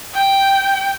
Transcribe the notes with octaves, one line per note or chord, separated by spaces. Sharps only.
G5